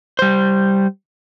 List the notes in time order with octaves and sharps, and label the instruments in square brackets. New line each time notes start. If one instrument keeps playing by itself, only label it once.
[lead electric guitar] G3 C5